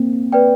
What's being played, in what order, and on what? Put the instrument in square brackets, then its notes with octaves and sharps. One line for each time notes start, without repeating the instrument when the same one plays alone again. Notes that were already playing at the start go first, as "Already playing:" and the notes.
Already playing: [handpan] A#3 C4
[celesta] B4 D5 G5